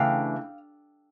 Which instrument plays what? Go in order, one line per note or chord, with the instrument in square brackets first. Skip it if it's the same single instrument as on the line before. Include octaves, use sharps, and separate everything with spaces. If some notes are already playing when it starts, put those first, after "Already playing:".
Already playing: [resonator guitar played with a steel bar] C#3 E3 A3 D4 F5 G5